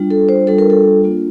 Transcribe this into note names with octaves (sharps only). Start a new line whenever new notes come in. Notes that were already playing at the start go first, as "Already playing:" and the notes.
Already playing: G3 D4 F4
A4
C5
G3 D4 F4 A4
A#4
A4
A#3 D4 F4